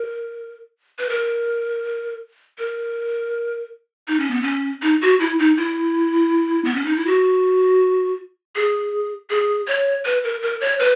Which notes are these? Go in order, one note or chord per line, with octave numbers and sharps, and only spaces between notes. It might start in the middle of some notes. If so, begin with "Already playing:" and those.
Already playing: A#4
B4
A#4
A#4
D#4
C#4
B3
C#4
D#4
F#4
E4
D#4
E4
B3
C#4
D#4
E4
F#4
G#4
G#4
C#5
B4
A#4
A#4
C#5
B4